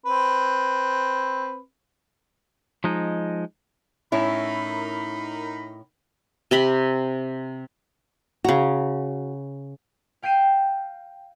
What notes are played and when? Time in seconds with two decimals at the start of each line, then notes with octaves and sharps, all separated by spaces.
0.06 C4 B4
2.84 F3 G#3 D#4
4.12 A2 C#4 D#4 E4 A#4 B5
6.51 C3 G4 B5
8.44 C#3 F#4 A#5
10.22 F5 G5 G6 C7 D#7 E7